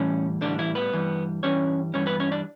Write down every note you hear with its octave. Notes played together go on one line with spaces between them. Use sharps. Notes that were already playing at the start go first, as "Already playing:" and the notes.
Already playing: A2 E3 G3 C#4
A2 D3 E3 G3 D4
E3 E4
B3 B4
G2 E3 G3
G2 E3 G3 C#4 C#5
G2 E3 G3 C#4 C#5
B3 B4
C#4 C#5
D4 D5